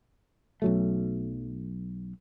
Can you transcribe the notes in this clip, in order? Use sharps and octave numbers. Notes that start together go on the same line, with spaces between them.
B1 F#3 A3